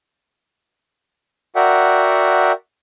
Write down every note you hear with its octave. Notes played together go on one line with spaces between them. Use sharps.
F#4 A#4 D5 E5 F#5 G5